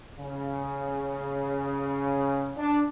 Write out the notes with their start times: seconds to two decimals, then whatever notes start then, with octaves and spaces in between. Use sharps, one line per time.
0.19 C#3
2.57 D4